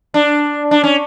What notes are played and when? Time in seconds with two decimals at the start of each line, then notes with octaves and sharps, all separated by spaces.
0.14 D4
0.71 D4
0.84 C#4